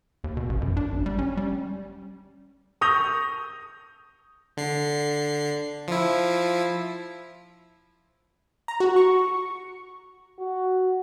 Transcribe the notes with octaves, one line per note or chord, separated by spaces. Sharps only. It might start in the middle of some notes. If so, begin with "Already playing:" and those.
D#2
B2
A1
F#2
D4
G#1
G3
C#4
G3
C#6 D#6 G6 A#6 F7
D3 C7
F3 E4
A#5
F#4
C#6
F#4